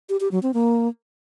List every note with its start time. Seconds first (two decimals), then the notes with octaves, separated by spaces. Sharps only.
0.09 G4
0.20 G4
0.32 F#3
0.43 C4
0.54 A#3